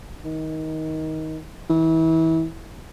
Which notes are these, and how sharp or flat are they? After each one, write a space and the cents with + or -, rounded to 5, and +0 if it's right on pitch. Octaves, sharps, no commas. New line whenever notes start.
D#3 +20
E3 -30